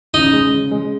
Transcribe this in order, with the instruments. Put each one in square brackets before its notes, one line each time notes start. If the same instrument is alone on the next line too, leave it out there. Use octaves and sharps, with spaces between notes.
[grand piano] C#3 [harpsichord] D#4
[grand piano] G#3
C#3
G#3